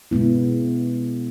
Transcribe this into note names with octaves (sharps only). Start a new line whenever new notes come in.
B2 G#3 B3 E4